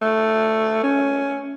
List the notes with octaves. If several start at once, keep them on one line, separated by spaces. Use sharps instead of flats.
A3
C#4